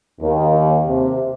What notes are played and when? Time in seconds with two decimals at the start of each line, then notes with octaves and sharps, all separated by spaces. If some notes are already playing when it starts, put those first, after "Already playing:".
0.20 D#2
0.86 C3